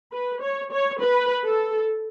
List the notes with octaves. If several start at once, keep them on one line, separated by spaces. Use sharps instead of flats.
B4
C#5
C#5
B4
A4